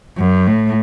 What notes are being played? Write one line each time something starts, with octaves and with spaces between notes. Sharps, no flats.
F#2
A2